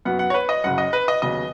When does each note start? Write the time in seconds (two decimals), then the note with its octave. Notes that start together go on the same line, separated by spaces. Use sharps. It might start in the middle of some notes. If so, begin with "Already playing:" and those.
0.05 F#2 F#3 B3 F#5
0.19 F#5
0.30 C#5
0.34 B4
0.49 D#5
0.64 F#1 F#2 C#3 F#5
0.78 D#5
0.93 B4
1.08 D#5
1.22 D#2 C#3 F#3 B3 D#5